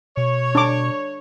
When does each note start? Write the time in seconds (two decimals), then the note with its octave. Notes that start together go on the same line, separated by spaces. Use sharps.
0.17 B2 C#5
0.55 D4 D6